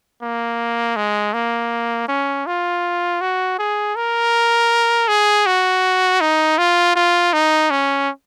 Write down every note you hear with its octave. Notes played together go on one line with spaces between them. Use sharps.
A#3
G#3
A#3
C#4
F4
F#4
G#4
A#4
G#4
F#4
D#4
F4
F4
D#4
C#4